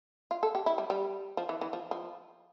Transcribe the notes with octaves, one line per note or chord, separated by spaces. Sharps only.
F4
A4
G4
E4
G3
G3
F3
E3
E3
F3
F3